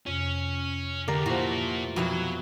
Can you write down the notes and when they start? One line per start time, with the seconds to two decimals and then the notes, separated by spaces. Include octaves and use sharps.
0.06 F2 C3 C#4
1.08 D2 G4 A#4 D5 F5
1.26 A#2 E3 F3 F#4 C5 C#6
1.96 F2 B2 F#3 E4 E5